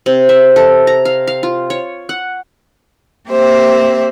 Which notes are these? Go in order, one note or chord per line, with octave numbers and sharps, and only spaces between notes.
C3
E5
A4
A#5
F5
F5
F4
C#5
F#5
A#3 C4 G4 C5 E5